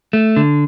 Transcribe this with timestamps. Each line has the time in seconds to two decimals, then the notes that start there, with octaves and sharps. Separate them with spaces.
0.13 A3
0.37 D3